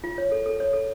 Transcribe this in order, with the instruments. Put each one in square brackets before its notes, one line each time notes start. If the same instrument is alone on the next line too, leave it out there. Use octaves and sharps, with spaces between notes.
[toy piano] F4
C#5
A4
A4
C#5
A4